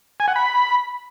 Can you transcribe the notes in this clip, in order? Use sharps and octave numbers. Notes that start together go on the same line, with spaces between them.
G#5
F#5
B5